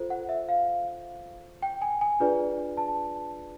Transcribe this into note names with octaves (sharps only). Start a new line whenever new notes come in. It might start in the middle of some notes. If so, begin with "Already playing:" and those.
Already playing: F4 A4 C5
F#5
E5
F5
G5
G#5
G#5
D4 F4 G#4 B4 D5
A5